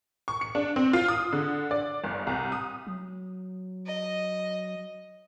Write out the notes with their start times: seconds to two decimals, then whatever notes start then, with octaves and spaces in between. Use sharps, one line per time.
0.28 C#6
0.41 C#7
0.55 D4
0.76 C4
0.93 F4
1.08 D#6
1.33 D3
1.71 D5
2.04 G1
2.27 C2
2.52 D#6
2.87 F#3
3.86 D#5